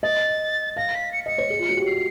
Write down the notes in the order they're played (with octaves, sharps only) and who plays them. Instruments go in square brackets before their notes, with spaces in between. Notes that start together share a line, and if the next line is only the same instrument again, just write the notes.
[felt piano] D#5 [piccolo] A6
[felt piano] F5 [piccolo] A#6
[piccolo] B6
C#7
[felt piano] D#5 [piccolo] C#7
[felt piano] C#5
G#4
F4
F#4
G4
[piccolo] C7